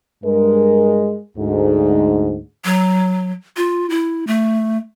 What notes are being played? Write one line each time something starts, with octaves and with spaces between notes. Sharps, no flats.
G2 G#3 A#4
D2 G#2
F#3
F4
E4
A3